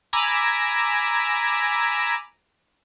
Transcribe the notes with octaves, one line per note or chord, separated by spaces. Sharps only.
G#5 A#5 B5 D6 E6